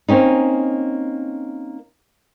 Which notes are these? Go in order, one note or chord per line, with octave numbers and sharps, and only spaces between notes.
A#3 C4 C#4 D#4